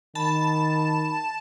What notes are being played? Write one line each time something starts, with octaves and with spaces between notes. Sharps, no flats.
D#3 A5 B5